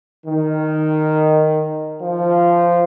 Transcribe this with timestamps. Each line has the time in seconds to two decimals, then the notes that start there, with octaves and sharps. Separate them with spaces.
0.25 D#3
2.01 F3